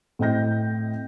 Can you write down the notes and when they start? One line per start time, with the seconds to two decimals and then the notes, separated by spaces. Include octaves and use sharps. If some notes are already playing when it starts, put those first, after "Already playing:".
0.19 A2 C4 D#5 G5 G6 A#6